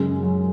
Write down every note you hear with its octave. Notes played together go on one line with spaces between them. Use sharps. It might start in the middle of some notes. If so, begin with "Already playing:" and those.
Already playing: F#2 C#3 G#3
F#3